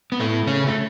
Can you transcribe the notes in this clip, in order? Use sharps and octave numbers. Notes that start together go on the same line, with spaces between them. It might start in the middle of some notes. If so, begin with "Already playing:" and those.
B3
A2 A3
C#3 C#4
A3